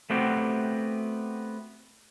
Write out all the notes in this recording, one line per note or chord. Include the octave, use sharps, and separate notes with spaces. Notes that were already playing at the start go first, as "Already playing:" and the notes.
A3 B3 C4 F#4 G4